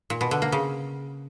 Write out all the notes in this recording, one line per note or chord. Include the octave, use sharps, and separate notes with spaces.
A#2
B2
D3
A#3
C#3